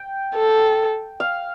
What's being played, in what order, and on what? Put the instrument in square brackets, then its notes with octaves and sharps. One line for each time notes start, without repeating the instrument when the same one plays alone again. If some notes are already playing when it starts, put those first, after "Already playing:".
Already playing: [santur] G5
[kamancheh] A4
[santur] F5